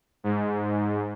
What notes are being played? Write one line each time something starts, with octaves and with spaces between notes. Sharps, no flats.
G#2